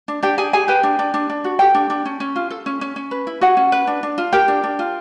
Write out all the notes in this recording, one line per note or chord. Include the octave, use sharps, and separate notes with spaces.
D4
D4 G4 G5
D4 G#4 G#5
G4 G#4 G#5
G4 B4 G5
D4
D4
D4
D4
F#4
G4 A4 G5
D4
D4
C#4
C#4
F4
A4
C#4
C#4
C#4
B4
E4
F#4 G#4 F#5
C#4
B4
D4
D4
F4
G4 A#4 G5
D4
D4
F4